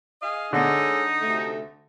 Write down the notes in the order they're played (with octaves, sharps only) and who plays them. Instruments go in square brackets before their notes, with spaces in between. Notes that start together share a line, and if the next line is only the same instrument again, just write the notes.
[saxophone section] G#4 D#5 F5
[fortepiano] D3 [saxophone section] G#3 A4 C#5 [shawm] D#4
[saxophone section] D2 C3 A3